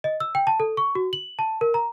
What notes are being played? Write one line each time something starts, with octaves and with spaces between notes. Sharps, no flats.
D#5
E6
G5
A5
A4
C#6
F#4
F#7
A5
A#4
A#5